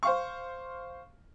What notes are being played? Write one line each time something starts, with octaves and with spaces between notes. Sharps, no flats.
C5 F5 C#6